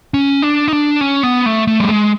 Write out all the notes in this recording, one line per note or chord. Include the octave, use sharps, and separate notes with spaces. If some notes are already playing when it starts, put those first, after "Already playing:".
C#4
D4
D#4
D4
C#4
B3
A3
A3
G3
G#3